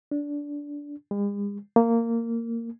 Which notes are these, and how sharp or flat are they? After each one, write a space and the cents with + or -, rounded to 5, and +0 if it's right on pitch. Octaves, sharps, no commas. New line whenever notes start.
D4 -15
G#3 -45
A#3 -15